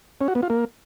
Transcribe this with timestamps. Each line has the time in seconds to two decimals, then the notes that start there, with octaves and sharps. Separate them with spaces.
0.21 C#4
0.28 F#4
0.35 B3
0.43 F4
0.50 A#3